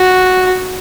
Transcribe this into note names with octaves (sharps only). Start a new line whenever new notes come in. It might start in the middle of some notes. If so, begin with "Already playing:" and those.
Already playing: F#4